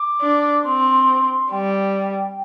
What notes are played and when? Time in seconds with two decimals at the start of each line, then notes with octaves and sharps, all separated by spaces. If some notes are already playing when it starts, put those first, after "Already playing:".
Already playing: D6
0.21 D4
0.64 C4 C6
1.51 G3 G5